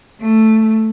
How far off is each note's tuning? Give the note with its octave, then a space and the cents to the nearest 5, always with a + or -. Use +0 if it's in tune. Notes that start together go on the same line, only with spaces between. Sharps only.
A3 +5